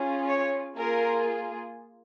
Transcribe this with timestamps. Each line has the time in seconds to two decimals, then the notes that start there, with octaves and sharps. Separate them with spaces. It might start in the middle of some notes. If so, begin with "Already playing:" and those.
Already playing: C#4 F4 G#4
0.27 C#5
0.76 A#3 F4 G#4 A#4